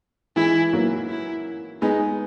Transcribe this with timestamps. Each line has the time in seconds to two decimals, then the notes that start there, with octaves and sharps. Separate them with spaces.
0.36 E3 G#3 E4
0.73 F#3 A#3
1.09 E4
1.82 G#3 B3 D#4